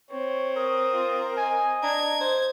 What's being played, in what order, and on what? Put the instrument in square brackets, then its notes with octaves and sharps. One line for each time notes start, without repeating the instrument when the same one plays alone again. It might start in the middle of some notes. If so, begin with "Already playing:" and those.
[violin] C4 [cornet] C#5
[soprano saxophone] A#4 [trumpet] D#6
[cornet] F4
[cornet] D#5 [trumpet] G#5
[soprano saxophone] D4 [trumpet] A#5 [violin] G#6
[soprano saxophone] C5